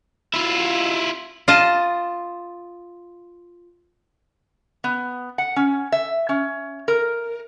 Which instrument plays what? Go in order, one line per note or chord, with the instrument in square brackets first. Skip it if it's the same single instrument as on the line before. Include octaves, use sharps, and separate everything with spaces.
[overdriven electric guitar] E4 F4
[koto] F4 D#5 F5 A5
[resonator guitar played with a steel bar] B3
F#5
C#4
E5
C#4
A#4